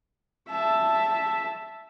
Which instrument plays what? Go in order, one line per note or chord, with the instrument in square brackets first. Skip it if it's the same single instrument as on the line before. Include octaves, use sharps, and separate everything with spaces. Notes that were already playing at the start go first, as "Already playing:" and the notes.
[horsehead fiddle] E5 A5